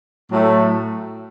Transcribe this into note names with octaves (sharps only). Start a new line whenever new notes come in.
A2 F#3 A3